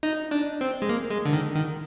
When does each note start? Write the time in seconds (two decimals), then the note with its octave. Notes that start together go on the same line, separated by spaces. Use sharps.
0.03 D#4
0.31 D4
0.61 C4
0.82 G#3
0.89 A#3
1.11 G#3
1.25 D3
1.33 D#3
1.55 D#3